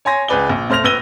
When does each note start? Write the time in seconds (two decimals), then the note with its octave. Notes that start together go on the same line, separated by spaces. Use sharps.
0.05 C#5 G#5 C6 A#6
0.28 C#2 G#4 B4 D5 G7
0.49 A#1
0.70 A3 C5 F6 A#6 F7
0.84 A#1 B4 E6 A#6 D#7 G7